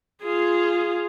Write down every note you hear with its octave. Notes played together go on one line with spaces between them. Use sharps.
F4 G#4